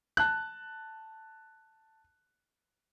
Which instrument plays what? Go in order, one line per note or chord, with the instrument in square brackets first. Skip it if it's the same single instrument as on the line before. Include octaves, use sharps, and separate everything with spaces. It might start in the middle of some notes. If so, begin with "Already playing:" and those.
[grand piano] A5 F#6